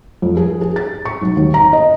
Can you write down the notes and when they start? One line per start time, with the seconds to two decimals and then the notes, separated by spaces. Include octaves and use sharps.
0.22 F2
0.37 G#4
0.61 G#4
0.76 A6
1.05 C#6
1.22 B1
1.37 D#2
1.54 A#5
1.73 D#5